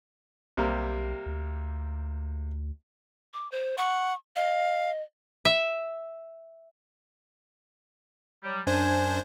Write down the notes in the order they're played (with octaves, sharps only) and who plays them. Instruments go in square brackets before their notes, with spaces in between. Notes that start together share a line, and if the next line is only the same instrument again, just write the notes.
[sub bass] B1 [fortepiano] C3 G3 A#3
[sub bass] D2
[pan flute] D6
C5
[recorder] F#5 [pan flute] C#6
[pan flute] D#5 [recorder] F5
[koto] E5
[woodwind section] F#3 G3
[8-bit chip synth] F#2 D4 C5 [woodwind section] G#5